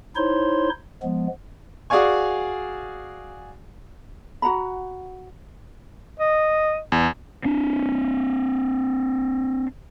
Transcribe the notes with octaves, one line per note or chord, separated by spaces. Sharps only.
D#4 E4 C5 C#5 C6
F3 G#3 B3
F#4 G#4 D5 F5 G#5 C#6
F#4 F#5 A#5 B5
D#5
E2
C4 D4